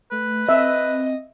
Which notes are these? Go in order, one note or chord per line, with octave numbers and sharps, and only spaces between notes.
A3 B4
C4 D#5 E5